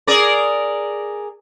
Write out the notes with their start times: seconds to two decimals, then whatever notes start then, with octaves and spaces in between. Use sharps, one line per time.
0.07 G#4 A#4 D5